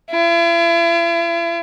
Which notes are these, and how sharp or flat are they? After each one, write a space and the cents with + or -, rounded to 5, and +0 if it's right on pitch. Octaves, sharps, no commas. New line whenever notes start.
E4 +45